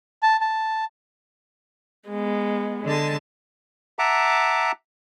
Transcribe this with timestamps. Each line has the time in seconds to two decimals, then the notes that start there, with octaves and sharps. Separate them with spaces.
0.23 A5
0.41 A5
2.09 G#3 B3
2.84 D3 G#3 A5
3.99 E5 F#5 A5 A#5 D6